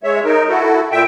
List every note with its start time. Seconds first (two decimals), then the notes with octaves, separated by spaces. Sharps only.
0.03 G#3 C#5 E5
0.25 D#4 A#4
0.49 E4 F#4 A4
0.92 A#2 E5 G5